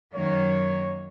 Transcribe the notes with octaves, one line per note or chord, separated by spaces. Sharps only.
F#2 D#3 F#3 A#3 C#5